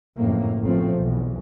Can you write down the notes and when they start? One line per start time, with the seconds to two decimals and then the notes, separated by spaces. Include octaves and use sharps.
0.17 F#1 F2 A2 A#3
0.62 A1 C#3 F3 A3 C4
0.94 B1 E2